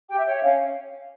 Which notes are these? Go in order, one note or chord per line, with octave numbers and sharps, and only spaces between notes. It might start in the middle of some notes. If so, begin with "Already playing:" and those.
G4 G5
E5
C#5 G5
E5
C#4 F5